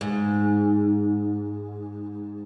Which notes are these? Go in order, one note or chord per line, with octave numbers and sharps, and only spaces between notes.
G#2